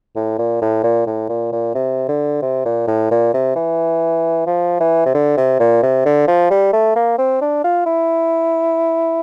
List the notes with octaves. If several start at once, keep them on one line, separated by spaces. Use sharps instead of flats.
A2
A#2
A2
A#2
A2
A#2
A#2
C3
D3
C3
A#2
A2
A#2
C3
E3
F3
E3
C3
D3
C3
A#2
C3
D3
F3
G3
A3
A#3
C4
D4
F4
E4